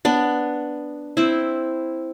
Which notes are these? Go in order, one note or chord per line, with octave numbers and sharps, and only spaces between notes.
B3 D4
C4 E4